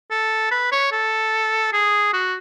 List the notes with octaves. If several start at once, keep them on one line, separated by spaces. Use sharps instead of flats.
A4
B4
C#5
A4
G#4
F#4